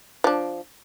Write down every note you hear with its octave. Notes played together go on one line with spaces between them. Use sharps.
F3 D4